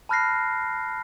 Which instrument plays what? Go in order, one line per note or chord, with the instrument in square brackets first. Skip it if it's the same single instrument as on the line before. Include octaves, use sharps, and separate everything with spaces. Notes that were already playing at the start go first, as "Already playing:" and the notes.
[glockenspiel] A5 B5 F6 F#6 A#6 C7